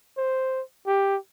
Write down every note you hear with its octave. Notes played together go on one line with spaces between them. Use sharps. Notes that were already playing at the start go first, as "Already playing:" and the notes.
C5
G4